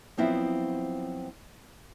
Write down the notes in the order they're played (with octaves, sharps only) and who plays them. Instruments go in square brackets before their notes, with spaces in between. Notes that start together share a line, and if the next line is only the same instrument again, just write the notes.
[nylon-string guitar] F3 F#3 B3 C4 E4 F4